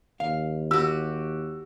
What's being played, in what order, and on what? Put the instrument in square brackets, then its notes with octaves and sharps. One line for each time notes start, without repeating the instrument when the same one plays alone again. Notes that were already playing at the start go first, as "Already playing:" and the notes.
[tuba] D#2 [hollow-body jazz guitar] F5
[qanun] F#4 G4 [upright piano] E6